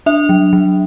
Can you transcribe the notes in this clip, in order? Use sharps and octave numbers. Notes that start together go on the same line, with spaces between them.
D4 E5
F#3
F#3